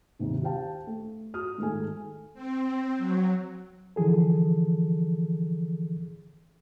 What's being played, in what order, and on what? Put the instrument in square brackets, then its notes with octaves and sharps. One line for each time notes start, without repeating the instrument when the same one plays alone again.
[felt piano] D#2 G#2 C3 D#3
G4 C5 F5 G5 A5
A3
F#4 D#6 F6
G#2 D#3 G#3 A3 A4 G#5
[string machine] C4
F#3
[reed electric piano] D3 E3 F3 G#4 A4